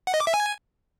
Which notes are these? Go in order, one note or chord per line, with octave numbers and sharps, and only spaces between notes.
F#5
D#5
D6
E5
G#5